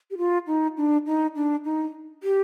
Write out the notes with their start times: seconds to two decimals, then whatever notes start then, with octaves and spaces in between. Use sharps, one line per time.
0.11 G4
0.18 F4
0.47 D#4
0.77 D4
1.07 D#4
1.36 D4
1.65 D#4
2.23 G4